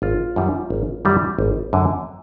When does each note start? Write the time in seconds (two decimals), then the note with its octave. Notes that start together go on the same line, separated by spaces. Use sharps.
0.02 G#1 F4
0.36 F#2 D#3 G3
0.70 G#1
1.05 F#2 D#3 G3
1.39 G#1
1.73 F#2 D3